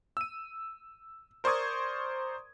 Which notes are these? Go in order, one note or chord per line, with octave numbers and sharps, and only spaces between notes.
E6 D#7
A#4 C5 D5 C#6 D#6 G#6